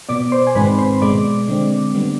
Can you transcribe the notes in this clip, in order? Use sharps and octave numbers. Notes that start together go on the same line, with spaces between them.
B2 B3 D5 D6
C5 C6
G#5
G#2 D#3 G#3 C4 B4 B5
C5 C6
B2 G#3 B3 D5 D6
D3 G#3 C4
D3 G3 B3